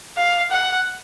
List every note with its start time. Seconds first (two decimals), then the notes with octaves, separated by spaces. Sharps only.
0.17 F5
0.51 F#5